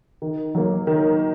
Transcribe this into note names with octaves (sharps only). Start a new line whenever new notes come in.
D#3
F#3 A#3
D#3